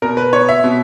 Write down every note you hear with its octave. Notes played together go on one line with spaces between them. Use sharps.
B2 A#4
B4
B3 C#5
E5
B2